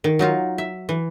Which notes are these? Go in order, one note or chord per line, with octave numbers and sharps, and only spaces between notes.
D#3
F#3 D#4 F4
E5
E3